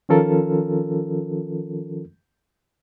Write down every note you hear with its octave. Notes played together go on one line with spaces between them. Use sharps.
D#3 F3 C#4 F4 A4 A#4